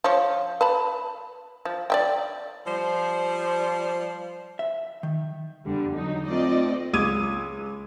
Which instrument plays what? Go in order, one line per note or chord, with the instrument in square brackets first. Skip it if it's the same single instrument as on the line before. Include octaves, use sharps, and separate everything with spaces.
[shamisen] F3 C#5
B4 A5 B5
F3
D5 E5 G5
[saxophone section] F3 G3 C5
[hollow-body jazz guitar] E5
D#3
[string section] E2 D3 G3
F#3 D#4
A3 C4 F4 D5 D#5
[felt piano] C#2 F4 D6 D#6 G#6 D#7